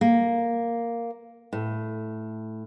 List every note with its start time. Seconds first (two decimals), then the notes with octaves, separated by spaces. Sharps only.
0.01 A#3
1.53 A2